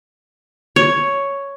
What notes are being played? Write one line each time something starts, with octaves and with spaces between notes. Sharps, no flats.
C#5